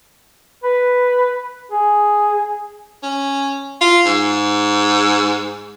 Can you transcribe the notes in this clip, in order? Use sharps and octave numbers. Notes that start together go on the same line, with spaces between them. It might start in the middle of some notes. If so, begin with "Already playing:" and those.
B4
G#4
C#4
F4
G#2